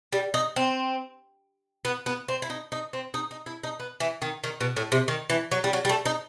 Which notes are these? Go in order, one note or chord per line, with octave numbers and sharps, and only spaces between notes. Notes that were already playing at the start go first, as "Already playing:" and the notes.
G3
D#4
C4
B3
B3
C4
E4
D#4
D#4
C4
D#4
D#4
E4
D#4
B3
E3
D#3
D#3
B2
A2
C3
D#3
E3
F#3
G3
F#3
G3
A3
D#4